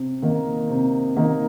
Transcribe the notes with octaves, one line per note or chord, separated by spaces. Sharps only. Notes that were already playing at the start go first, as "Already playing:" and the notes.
Already playing: C3
D#3 A#3 D#4
C3
D#3 A#3 D#4